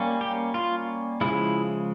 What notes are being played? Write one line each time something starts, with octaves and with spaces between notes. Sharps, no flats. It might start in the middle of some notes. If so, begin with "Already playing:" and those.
Already playing: G3 A#3 C#4
G4
F4
C#3 F3 G#3 E4